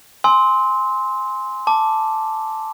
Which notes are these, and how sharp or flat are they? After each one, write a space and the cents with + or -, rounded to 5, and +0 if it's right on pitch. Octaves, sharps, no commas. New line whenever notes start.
G#5 +0 C6 +0 E6 -35
A5 +0 D6 +0